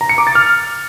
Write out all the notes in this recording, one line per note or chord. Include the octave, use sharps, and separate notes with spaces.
A#5
C#7
D6
A6
F6